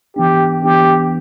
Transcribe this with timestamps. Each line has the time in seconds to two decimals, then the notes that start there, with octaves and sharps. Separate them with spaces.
0.16 E3 B3 D4 G4
0.63 E3 B3 D4 G4